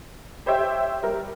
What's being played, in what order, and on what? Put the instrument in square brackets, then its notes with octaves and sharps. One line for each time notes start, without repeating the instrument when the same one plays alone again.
[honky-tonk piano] G4 C5 C#5 E5 G5
G3 A#4